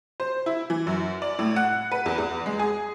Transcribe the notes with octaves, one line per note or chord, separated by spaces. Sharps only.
C5
E4
E3
F#2
D5
A2
F#5
B4
E2
E2
G#3
G#4